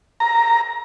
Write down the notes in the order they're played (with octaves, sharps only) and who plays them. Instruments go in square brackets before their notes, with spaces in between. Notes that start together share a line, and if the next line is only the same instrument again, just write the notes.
[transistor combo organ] A#5